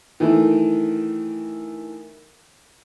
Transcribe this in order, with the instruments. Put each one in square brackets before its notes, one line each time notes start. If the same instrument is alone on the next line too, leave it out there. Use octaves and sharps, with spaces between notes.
[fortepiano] D#3 E3 A3